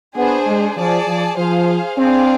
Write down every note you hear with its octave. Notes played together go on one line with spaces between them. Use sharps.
B3 D4 G#4 C5
G#3
F3 G#4 D5 A5
F3
F3 G#4 C5 F5
C4 D4 G#4 D5 F5